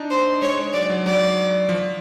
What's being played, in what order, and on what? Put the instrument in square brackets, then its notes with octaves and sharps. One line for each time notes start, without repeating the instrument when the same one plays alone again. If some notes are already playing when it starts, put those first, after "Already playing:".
Already playing: [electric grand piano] D4 D#4
[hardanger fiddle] C5
[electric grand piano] G#3 [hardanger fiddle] C#5
[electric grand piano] G#3
[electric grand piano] F#3 [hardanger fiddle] D5
[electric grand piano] F#3
[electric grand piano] F#3 [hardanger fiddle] D5
[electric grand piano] F3